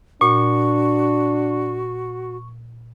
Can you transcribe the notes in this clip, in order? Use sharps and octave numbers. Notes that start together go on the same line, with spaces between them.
A#2 D4 F#4 C#6